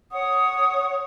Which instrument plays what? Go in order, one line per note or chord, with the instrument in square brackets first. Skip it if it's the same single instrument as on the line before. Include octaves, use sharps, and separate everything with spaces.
[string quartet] C#5 [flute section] F#5 D#6